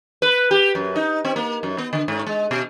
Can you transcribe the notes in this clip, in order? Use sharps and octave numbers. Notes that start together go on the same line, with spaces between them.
B4
G4
F#2
D#4
C4
A#3
F#2
B3
D3
G#2
G#3
B2